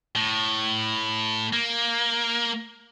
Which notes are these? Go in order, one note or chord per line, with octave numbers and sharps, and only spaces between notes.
A2
A#3